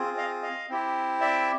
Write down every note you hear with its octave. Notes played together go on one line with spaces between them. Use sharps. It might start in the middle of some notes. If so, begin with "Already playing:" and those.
Already playing: C4 F4 G#4
D#5 F5
D#5 F5
C4 E4 G4
D5 E5